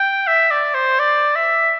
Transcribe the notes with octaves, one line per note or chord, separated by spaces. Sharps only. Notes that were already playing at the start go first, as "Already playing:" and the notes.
Already playing: G5
E5
D5
C5
D5
E5